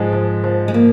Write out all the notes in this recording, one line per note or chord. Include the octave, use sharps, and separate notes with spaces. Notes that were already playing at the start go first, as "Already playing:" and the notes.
Already playing: G#2 F3 G#3
F3
F3
G#3
A#3